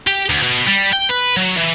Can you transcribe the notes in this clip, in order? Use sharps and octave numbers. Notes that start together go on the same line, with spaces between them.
G4
D2
B2
G3
G5
B4
F#3
E3